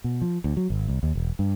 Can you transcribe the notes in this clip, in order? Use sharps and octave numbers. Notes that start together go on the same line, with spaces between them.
B2
F3
D2
F#3
G#1
C2
D#2
E1
G2